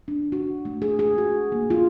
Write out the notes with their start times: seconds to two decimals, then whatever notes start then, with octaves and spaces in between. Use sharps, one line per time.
0.08 D4
0.32 F#4
0.65 A3
0.82 G#4
0.99 G#4
1.18 F#4
1.52 A#3
1.70 F4